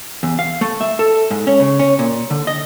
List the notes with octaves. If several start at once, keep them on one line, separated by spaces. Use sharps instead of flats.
E2
F5
A3
E5
A4
G#2
C#4
C#3
C#4
A#2
D3
D#5